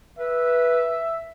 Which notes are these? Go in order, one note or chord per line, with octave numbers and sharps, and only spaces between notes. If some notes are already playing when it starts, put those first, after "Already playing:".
B4 E5